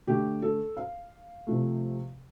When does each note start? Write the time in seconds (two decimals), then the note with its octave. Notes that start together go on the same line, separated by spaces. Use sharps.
0.07 D3 A3 G4
0.42 A4
0.77 F5
1.47 C3 F3 A3